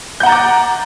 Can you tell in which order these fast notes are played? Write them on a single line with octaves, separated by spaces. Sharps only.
G6 F#5 A#5 A6 D6